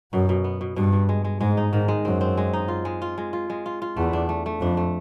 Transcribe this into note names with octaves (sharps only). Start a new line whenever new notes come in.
F#2 B2
B2
B3
B2
G2 B2
B2
G#3
G#3
G#2 G#3
D#4
G#2 D#3
G#3
F#2 C4
C4
G#3
D#4
F4
G#3
F4
G#3
F4
G#3
F4
F4
E2 A3
D4
A3
A3
F2 D4
A3